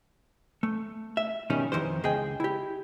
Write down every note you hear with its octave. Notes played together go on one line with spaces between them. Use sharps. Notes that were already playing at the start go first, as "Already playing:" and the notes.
A3
E5
B2 D#3 G3 C#4
F2 D#3 E3 C5
C#2 G#4 D#5 G5
E4 G4